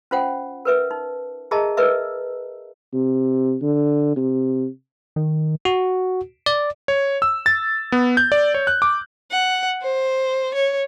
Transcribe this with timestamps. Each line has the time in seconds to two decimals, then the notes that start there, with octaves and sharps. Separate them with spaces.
0.11 C#4 F4 C5 F#5 G5
0.65 A#4 B4 E5
0.91 D#4
1.51 G#4 A#4 D#5 E5 A5 A#5
1.77 A#4 B4 D#5 E5 E6
2.94 C3
3.62 D3
4.16 C3
5.16 D#3
5.65 F#4
6.46 D5
6.88 C#5
7.22 E6
7.46 A6
7.92 B3
8.17 G6
8.32 D5
8.54 C#5
8.67 F#6
8.82 D6
9.31 F#5
9.82 C5
10.54 C#5